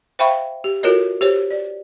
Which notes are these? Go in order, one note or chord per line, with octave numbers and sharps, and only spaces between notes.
C5 E5 F5 G5 B5 C#6
G4
F4 F#4 A4 A#4 C#5 D#5
G4 C5 C#5
D5